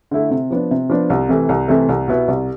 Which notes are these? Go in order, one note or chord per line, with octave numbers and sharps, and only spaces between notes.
D3 A3 E4
C3
F3 B3 D4
C3
F3 B3 D4
C2
C3 E3 A3
C2
C3 E3 A3
C2
B2 B3 E4
C2